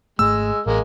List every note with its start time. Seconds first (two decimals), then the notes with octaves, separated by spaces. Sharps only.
0.19 G#1 G#2 G#3 A3 E6
0.66 A1 G#3 A#3